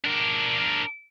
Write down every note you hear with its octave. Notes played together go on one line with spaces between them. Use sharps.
D4 A#4